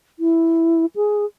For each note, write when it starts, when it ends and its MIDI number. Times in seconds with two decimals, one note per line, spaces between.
0.19 0.86 64
0.96 1.25 68